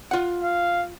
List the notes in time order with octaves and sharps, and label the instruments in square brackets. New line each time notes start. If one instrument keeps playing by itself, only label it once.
[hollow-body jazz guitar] F4 F#5
[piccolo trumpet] F5